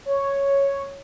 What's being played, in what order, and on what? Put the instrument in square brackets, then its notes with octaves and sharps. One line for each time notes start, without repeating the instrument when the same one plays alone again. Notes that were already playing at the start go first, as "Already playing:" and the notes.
[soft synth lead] C#5